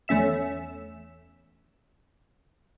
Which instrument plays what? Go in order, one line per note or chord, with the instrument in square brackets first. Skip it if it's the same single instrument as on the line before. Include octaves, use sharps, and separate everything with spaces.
[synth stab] E2 A3 C#4 E5 E7